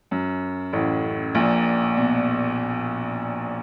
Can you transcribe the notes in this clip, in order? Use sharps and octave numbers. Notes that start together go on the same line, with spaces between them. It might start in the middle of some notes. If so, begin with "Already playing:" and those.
F#2
A1 A2
A#1 A#2
B2